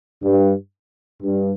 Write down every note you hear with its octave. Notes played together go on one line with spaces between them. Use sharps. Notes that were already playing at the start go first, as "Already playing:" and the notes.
G2
G2